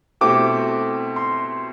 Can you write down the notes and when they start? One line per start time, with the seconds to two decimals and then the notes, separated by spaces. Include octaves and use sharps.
0.21 B2 A3 C4 E4 G4 D6
1.16 C6